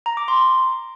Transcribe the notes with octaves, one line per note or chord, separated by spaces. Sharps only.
A#5
D6
C6